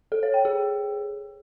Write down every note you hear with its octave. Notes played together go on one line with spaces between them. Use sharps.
A4
C#5
G5
G#4